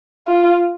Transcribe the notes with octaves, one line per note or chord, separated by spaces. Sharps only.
F4